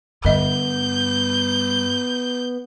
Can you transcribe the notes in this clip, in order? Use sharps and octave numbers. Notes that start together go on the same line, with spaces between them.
G2 D3 B3 D#5 E5 G6